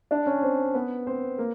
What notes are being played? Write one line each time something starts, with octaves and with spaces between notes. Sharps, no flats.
D4 D5
C#4 C#5
C4 C5
B3 B4
C4 C5
A#3 A#4